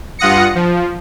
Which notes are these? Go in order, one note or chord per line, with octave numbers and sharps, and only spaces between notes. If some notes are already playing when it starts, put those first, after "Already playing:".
G2 F4 F#5 D#6 A#6 C#7
F3